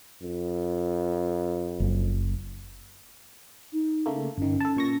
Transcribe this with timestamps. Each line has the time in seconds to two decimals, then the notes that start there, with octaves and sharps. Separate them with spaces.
0.23 F2
1.80 F#1
3.73 D#4
4.06 C#3 A3 A#3
4.38 G1 D#3 C#4
4.60 A4 A5
4.77 A#2 C#6 A#6